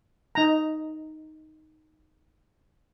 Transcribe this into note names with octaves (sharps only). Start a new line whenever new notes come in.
D#4 A#5